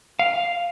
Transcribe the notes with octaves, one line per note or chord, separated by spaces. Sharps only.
F5